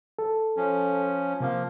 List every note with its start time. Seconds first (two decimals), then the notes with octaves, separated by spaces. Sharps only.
0.19 A4
0.57 F3 C#4
1.40 C3 F3 A#3 F5